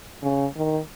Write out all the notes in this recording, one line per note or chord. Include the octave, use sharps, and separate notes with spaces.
C#3
D#3